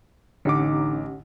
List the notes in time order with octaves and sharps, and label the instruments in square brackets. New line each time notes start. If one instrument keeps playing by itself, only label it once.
[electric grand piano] A1 D6 [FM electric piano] D3 [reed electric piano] C#4 G4 F#5 [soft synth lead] D#4